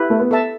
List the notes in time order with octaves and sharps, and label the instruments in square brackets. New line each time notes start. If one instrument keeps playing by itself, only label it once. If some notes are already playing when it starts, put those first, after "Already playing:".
Already playing: [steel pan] E4 G4 B4
[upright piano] A3
B3
[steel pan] A4 E5 A5